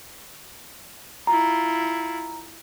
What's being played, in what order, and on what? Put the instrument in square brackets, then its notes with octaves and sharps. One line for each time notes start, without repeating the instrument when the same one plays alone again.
[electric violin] E4 F4 [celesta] A#5